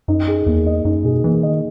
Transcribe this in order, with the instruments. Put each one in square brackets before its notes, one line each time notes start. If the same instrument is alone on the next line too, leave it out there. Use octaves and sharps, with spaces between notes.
[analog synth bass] F#2 [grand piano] D#4
[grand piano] G#4
[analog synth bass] E2 [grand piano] A#3
[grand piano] D#5
[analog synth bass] F#2 [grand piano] D#4
[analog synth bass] B2 [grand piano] G#4
[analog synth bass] E3 [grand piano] A#3
[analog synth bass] D#3 [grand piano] D#5